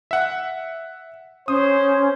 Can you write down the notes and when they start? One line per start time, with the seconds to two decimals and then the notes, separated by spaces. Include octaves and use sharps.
0.11 E5 F#5
1.48 C#4 C5 D#6